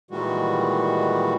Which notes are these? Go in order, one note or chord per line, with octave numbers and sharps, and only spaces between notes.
A#2 D#3 E3 G3 G#3 F#4